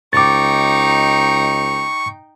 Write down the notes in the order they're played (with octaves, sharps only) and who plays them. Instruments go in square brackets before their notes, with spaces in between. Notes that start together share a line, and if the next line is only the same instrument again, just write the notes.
[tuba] C#2 [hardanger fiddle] D#4 G5 [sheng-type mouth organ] C#6 [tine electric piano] D6 A6